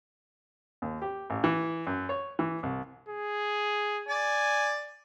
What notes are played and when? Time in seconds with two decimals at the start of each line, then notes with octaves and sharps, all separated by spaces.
0.82 D#2
1.02 G4
1.30 A1
1.44 E3
1.87 F#2
2.09 C#5
2.39 E3
2.63 C2
3.08 G#4
4.08 D5 G#5